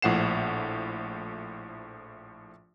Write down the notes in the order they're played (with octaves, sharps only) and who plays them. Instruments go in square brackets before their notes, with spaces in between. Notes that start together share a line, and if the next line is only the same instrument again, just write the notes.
[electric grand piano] A#1 A2 F3 F#5 C7 E7